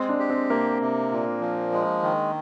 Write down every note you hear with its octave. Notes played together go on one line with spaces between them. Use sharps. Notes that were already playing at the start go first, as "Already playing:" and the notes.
Already playing: G#3 C4
D4
G4
C4
C3 A#3
C3
A#2
F3
G#3
D#3